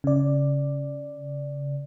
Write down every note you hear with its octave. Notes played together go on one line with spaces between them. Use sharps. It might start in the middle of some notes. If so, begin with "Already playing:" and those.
C#3 D5